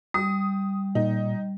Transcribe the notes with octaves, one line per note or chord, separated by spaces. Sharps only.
G3 D#6
A#2 D#4